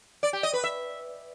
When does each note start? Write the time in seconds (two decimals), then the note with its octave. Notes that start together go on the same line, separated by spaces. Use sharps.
0.23 D5
0.33 G4
0.43 D#5
0.53 B4
0.64 E5